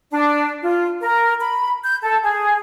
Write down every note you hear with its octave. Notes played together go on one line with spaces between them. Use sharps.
D4
F4
A#4
B5
G6
A4
G#4